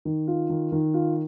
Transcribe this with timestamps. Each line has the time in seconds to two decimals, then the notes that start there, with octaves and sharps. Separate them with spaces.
0.05 D#3
0.27 F4
0.50 D#3
0.72 D#3
0.94 F4